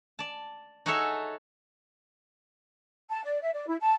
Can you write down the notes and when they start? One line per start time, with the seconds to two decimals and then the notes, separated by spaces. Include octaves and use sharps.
0.19 D5 A5
0.86 D#4 F#4 G#4 A4 C#5 E5
3.10 A5
3.24 D5
3.42 E5
3.54 D5
3.68 E4
3.81 A5